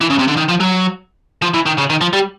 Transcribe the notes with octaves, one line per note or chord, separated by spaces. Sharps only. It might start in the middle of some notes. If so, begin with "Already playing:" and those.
E3
C#3
C3
D3
D#3
F3
F#3
F3
E3
D#3
C#3
D#3
F3
G3